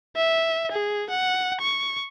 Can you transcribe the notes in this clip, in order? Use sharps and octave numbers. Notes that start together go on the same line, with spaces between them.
E5
G#4
F#5
C#6